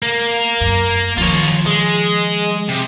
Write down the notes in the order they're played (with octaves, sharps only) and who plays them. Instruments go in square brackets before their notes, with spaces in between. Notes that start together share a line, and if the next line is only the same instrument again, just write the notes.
[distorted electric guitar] A#3
[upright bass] F#2
[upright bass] D#3 F3 [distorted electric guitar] F4 C#5
[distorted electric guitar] G#3
C3